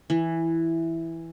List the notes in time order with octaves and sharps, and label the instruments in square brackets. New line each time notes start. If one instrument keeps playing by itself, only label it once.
[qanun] E3